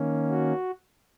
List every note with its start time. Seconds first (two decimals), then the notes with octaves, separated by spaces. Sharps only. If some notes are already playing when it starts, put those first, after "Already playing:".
Already playing: D#3 A#3 C#4
0.29 F#4